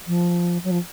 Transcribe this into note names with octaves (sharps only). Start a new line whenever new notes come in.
F3
F#3
F3